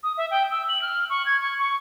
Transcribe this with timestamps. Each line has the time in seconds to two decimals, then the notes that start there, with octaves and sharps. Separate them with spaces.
0.03 D#6
0.17 E5
0.31 G5
0.51 E6
0.69 F#7
0.82 F6
1.10 C#6
1.26 G#6
1.41 C#6
1.59 C#6